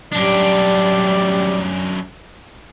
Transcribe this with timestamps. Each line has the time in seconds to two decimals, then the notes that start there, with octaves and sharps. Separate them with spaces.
0.12 F#2 G3 D4 D5